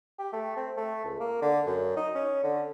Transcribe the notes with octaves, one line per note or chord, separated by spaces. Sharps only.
G4
A3
C4
A3
C#2
A#3
D3
F#2
D#4
C#4
D3